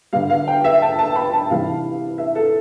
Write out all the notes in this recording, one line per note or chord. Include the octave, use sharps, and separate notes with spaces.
D3 G3 F5
F5
G5
E5
A5
A5
B5
A5
C3 E3 G3 F5
E5
A4